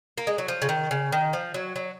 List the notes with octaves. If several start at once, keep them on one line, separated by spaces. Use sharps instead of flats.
A#3
G#3
F#3
F3
C#3
D#3
C#3
D#3
F3
F#3
F#3